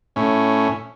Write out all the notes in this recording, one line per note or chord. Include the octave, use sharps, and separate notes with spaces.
A2 C#4